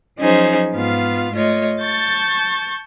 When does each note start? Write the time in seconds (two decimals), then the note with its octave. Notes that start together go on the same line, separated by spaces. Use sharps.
0.19 F3 F#3 C#4 D#4 G#4 C5
0.75 G#2 B3 F4 F5
1.35 A3 F4 C#5 D#5
1.81 A5 C#6 G6 A6